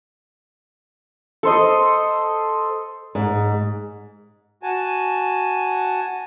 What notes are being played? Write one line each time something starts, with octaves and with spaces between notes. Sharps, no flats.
A4 C5 D#5
G#2
F#4 G#5 A5